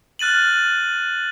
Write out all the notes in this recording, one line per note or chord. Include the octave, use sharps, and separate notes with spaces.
F6 F#6 A6 D#7 F#7